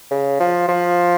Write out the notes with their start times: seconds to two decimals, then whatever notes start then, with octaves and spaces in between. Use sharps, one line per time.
0.11 C#3
0.40 F3
0.69 F3